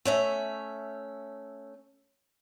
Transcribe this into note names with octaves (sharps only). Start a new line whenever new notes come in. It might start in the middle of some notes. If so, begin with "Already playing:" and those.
A3 C#4 E5